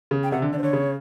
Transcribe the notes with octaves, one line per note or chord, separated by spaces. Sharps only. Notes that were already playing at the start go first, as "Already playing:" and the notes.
C#3
G5
C3 F#5
D3
D3 D5
C5
D3 C#5
C#3